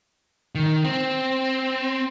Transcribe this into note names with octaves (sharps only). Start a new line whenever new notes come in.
D#3
C4